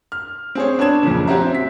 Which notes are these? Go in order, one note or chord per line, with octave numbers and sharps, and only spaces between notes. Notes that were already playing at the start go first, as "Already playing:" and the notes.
F6
C4 G#4 C#5
B3 D4 C#5 A5 G#6 E7
F2 A#2 C#3
C4 C#4 F#4 G4 E5 A#5
B6